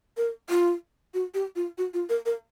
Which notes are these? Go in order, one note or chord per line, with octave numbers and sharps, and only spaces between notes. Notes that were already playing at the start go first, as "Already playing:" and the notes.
A#4
F4
F#4
G4
F4
F#4
F4
A#4
A#4